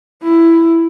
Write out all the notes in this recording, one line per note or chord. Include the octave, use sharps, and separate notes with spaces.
E4